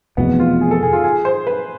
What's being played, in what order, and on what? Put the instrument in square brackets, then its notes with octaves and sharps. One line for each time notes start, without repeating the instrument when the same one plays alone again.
[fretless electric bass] F1 E2 B2 [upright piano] B3
[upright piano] F4
G#4
A4
G#4
F4
G#4
C5
B4